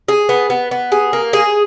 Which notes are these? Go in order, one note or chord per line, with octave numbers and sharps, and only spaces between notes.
G#4
B3
B3
B3
G#4
A#3
G#4